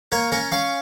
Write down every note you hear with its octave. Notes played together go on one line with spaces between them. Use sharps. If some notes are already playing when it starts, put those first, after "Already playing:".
A#3 A#4 C#5
C#4 A#4 C#5
C#4 C#5 F5